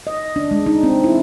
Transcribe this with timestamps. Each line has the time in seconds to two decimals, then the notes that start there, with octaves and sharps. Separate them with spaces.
0.07 D#5
0.36 D4
0.51 G#3
0.66 D#4
0.83 C4
1.04 E4